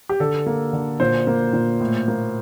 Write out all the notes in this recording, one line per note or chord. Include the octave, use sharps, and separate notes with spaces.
G4
D3 A4
A#3
D3
A#2 C5
A#3
A#2
A2
A#3